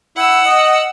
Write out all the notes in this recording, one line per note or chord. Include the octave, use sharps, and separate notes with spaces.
E4 F#5 E6
D#5